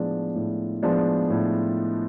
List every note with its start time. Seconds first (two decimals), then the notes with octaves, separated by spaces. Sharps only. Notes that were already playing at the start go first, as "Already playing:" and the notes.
Already playing: A2 F3 G#3 B3 D4
0.35 A2
0.83 F3 G#3 B3 D4
1.30 A2